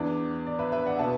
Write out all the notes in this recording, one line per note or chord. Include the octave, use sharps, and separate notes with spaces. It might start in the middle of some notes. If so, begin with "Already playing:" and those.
Already playing: E2 E3 D4 D5
D5
B4 E5
B4 E5
D5 F#5
B2 B3 E5 A5